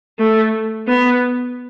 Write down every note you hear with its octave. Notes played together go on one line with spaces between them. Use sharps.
A3
B3